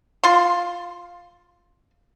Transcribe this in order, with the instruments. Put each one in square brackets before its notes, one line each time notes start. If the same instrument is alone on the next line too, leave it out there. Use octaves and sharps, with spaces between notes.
[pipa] F4 C6